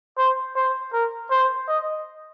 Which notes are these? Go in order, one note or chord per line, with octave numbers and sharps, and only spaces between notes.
C5
C5
A#4
C5
D#5